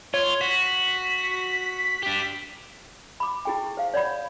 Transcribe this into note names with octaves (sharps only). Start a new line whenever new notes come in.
F4 C#5
F#4 B6
D4 G4
B5 D6
E4 G#4 G5
C5 F5
C#5 D5 F#5 B5